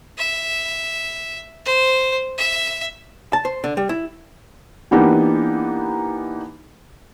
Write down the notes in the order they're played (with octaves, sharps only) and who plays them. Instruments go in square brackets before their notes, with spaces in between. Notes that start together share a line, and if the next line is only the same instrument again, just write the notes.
[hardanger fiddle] E5
C5
E5
[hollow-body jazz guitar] A5
C5
D3
G3
E4
[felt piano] E3 A#3 B3 D4 D#4 G4